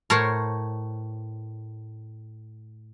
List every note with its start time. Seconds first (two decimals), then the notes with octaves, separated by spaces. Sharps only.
0.10 A2 A#4 C5 C#5